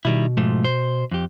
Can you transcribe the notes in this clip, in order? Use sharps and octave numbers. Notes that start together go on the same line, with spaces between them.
B2 D#3 G3 E4
G#2 F3 A3
C5
F2 G4